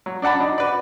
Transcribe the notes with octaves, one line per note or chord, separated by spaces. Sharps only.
F#3
D4 D5 F#5 A5 B5
D4 D#4
F#4 B4 D5